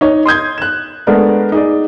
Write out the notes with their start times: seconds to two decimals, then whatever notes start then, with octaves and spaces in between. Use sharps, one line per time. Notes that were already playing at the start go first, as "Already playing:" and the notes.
0.01 D#4 C#5
0.26 C6 D#6 G6 G#6
0.58 F#6 E7
1.07 G#3 A3 B3 D4 A#4
1.52 D#4 G#4 D5